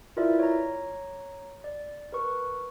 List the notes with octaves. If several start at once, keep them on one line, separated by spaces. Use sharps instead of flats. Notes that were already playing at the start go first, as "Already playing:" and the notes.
E4 F4 A#4 B4 D5 E5
C#5 A#5
D5
A#4 B4 C#6